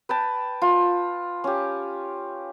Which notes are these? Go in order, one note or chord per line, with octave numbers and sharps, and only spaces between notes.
B4 G5 A5
F4
C#4 G4